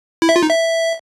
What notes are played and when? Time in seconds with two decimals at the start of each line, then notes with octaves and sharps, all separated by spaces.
0.22 E4
0.29 E5
0.36 F4
0.43 D#4
0.49 E5